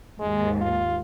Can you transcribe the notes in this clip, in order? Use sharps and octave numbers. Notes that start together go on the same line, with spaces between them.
D#2 G#2 G#3
F4